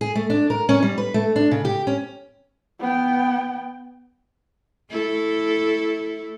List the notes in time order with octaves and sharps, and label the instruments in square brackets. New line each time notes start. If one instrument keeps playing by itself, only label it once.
[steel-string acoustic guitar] G#4
A3
D4
A#4
C#4
G3
B4
A3
D4
C#3
G4
C#4
[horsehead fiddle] B3 G5
[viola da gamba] A3 E4 A4